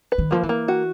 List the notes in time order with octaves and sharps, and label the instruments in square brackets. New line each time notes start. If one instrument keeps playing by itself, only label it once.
[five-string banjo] B4
[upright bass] D#3
[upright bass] F3 [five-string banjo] A#3
[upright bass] E3
[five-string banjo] A#3
F#4